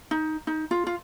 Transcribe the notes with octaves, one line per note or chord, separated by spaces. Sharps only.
D#4
D#4
F4
F4